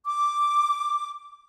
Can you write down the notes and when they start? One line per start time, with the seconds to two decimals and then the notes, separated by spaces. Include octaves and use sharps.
0.06 D6